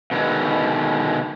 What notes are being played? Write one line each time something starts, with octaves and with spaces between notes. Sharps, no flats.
B2 D3 D#3 G#3